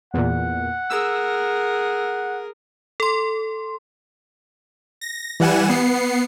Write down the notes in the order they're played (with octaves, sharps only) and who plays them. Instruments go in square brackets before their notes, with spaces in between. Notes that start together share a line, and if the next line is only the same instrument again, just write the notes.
[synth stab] E2 A#2 [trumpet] F#5
[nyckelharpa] G#4 A#4 [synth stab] E6
[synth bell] A4 C6
[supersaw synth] A#6
E3 G3 F#5 G#5 E7
B3 C7 C#7